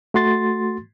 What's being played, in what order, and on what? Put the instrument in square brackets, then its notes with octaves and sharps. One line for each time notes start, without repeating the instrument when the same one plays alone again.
[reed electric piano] A3 F#4 C6 A6